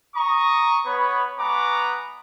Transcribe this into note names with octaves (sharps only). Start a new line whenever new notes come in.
A#5 C#6 D#6
B3 B4 C#5
G#3 B3 B4 A#5 C#6 D6